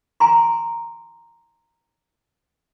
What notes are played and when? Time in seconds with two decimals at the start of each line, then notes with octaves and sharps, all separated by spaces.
0.20 G#5 A#5 C6